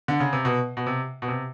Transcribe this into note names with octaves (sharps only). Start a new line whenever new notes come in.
D3
C#3
C3
B2
B2
C3
B2
C3